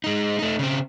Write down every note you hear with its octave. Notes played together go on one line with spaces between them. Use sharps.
G#3 D#4
A3 D#4
C#3 C4